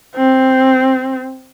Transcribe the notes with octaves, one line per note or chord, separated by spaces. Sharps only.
C4